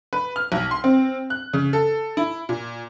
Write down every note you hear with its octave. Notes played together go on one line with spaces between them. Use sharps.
B4
F6
B1
C6
C4
F#6
C#3
A4
E4
A#2